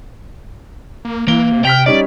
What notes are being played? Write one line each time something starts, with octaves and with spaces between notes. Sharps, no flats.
A#3
E3 A#3 G7
C3
G5 F6 B6 F7
G3 C#4 D#4 D5